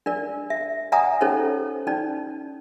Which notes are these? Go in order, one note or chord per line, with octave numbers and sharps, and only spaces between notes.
D4 A#4 D5
E5
D5 E5 F#5 G#5 A#5 D#6
C#4 D#4 A4 C5 C#5
C#4 D#4 D5